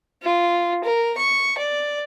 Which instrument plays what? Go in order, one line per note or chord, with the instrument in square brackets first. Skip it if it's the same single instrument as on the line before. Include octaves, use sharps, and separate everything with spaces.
[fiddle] F4
A#4
C#6
D5